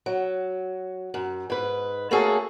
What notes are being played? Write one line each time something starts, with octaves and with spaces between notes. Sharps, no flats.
F#3
F#2
G#2 B4
A3 A#3 C#4 F#4 G#4 A4